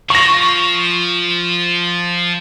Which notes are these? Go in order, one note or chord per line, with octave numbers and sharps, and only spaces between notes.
F3 C#6 A#6